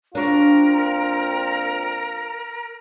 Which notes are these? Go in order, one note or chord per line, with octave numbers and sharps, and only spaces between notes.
A#2 C4 D4 F4 F#4 A#4